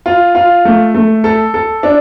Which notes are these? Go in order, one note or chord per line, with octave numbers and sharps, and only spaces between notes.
F4
F4
A3
A3
A4
A4
D4